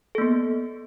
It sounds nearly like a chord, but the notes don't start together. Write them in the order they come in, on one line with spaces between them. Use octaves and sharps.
A4 A#3 B3